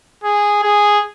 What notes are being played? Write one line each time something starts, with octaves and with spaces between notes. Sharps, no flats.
G#4
G#4